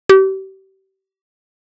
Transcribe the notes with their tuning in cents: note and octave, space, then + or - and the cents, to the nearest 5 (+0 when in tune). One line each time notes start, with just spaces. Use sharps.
G4 -35